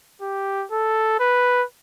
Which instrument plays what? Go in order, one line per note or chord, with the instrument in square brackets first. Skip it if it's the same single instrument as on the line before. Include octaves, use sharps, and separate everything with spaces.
[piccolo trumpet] G4
A4
B4